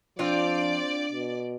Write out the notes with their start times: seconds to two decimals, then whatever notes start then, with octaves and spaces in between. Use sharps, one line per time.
0.19 F3 C4 D4 F4 D5
1.12 B2